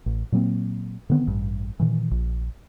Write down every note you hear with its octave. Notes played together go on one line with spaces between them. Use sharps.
A1
A#2 F#3 A#3 C4
D3 D#3 B3 C4
A1 G2
A#2 D#3 E3
A#1